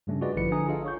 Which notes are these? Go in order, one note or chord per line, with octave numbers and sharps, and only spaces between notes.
G2 C#3 G3 A3 C#4 D4
F4 F#4 G#4 B4 D5 D#5
A1 D3 F3 E4 B4 C#7
D3 D4 G#5 A#5 D#6
F4 G#4 A4 D#5 F5
C#5 C#6 G6